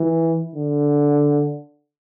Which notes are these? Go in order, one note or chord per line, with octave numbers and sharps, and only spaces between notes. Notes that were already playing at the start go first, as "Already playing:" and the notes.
Already playing: E3
D3